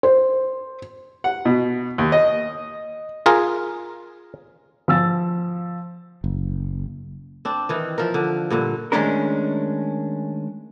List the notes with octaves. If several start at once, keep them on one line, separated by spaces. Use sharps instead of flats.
C5
F#5
B2
D#2
D#5
F4 G#4 A#4
F3 E6 A6
F#1
C4 D4
D#3 E3
F3 A#4
D3
G2 A#2 D3
D#3 G#3 A3 C#4 D4 A#4